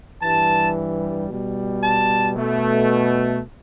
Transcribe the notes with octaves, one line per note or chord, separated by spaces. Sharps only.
G2 E3 G3 A5
B2 G3
A5
B2 A3